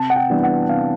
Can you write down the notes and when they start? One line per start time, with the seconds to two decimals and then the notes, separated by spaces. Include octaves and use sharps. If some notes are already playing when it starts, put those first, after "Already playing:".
Already playing: C3 A5
0.10 F#5
0.16 G5
0.29 E3 G3 B3 D4
0.43 F#5
0.69 C3 F5